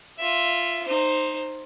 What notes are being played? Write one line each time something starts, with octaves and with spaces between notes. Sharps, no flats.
F4 E5
D#4 C5